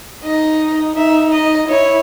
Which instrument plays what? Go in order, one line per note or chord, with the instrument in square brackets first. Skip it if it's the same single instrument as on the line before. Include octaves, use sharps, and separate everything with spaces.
[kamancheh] D#4 [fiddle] D#5
[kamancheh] D#4 [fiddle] E5
[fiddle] D#5
[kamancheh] E4 [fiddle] C#5